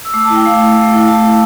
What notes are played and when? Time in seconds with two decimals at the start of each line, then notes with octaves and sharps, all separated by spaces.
0.05 E6
0.13 A3 D6
0.24 A5
0.29 E4 G5
0.45 A3 F5
0.61 E4
0.76 A3
0.92 E4
1.07 A3 A5
1.23 E4